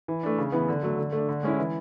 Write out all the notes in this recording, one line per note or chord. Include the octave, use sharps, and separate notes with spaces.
E3
A3 D4
C#3
E3 B3
D3
F#3 A3
D3
A3 D4
D3
G#3 C#4 E4
E3